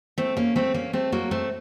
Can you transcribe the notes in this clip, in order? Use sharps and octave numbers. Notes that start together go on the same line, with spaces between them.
A3 C4
A#3 C#4
A3 C4
A#3 C#4
A3 C4
F#3 A#3
A3 C4